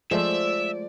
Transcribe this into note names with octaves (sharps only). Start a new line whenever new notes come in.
F3 G#3 A3 D5 E5